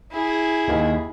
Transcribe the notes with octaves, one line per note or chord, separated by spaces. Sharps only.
E4 G#4
D#2